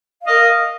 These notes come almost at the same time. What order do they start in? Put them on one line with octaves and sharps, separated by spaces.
F5 D#5 A#4